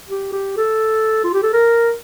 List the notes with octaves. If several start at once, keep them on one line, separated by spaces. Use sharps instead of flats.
G4
G4
A4
F4
G4
A4
A#4